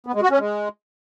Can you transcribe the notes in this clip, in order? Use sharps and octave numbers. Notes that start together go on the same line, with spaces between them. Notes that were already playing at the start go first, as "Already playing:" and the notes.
B3
G#3
F#4
C#4
G#3